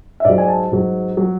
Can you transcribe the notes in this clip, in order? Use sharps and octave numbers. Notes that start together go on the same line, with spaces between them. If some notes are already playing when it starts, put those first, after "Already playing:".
E5
G#2 F#3 D5
G#5
A5
G#2 F#3
F#3